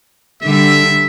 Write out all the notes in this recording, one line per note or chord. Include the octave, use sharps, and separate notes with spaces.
D3 G3 E5